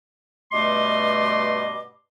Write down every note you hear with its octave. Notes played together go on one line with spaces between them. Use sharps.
G2 B2 A3 D#5 C6 D6